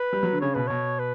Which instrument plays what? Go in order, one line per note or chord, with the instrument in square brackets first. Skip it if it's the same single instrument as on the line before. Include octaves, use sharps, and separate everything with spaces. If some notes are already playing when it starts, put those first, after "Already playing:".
Already playing: [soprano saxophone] B4
[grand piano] G3
F#3
D3
[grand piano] C#3 [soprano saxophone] C#5
[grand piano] B2 [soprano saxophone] B4
[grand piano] B2 [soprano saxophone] C#5
[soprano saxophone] B4